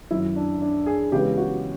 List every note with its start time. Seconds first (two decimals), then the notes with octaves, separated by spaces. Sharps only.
0.11 F#2 D#3 F#3 E4
0.36 D4
0.62 D4
0.86 G#4
1.12 C#3 E3 G#3 B3 G4
1.37 F#4